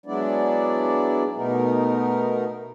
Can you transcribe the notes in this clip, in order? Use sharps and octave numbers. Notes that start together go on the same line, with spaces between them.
F#3 G#3 B3 D4 E4 D5
B2 A3 B3 D#4 A#4